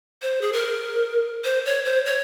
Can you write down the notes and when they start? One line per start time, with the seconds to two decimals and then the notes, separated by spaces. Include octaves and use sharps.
0.22 C5
0.41 G#4
0.53 A#4
1.44 C5
1.66 C#5
1.85 C5
2.06 C#5